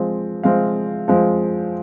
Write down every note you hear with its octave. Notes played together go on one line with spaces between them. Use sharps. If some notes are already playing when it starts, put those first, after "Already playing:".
Already playing: F3 G#3 C4
F3 G#3 C4 F5
F3 G#3 C4